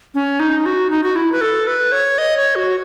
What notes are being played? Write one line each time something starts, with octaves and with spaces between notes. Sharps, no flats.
C#4
D#4
F#4
D#4
F#4
E4
B4
A4
B4
C#5
D#5
C#5
F#4